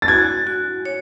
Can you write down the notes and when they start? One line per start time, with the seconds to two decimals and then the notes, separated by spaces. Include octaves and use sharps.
0.02 A6
0.08 F#4 G#6
0.47 F#4
0.85 C#5